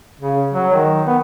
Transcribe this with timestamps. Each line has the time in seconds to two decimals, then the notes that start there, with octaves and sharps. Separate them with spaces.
0.20 C#3
0.53 F#3
0.73 D#3
1.07 B3